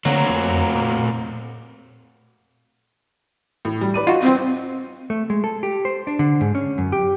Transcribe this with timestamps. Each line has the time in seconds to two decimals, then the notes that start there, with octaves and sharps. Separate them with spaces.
0.05 D3 F#3 A3 A#3 C4
0.30 F2
0.75 A#2
3.65 A2
3.81 G3
3.94 B4 D5 D#7
4.07 D#4 F4 F#4
4.22 C4
5.10 A3
5.30 G#3
5.44 A4
5.63 G4
5.85 C5
6.07 D4
6.19 D3
6.41 G#2
6.55 C#4
6.78 F#2
6.92 G4